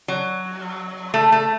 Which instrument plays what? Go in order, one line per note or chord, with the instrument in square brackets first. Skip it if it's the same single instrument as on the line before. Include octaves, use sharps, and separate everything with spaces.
[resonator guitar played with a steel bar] F#3
A3
A3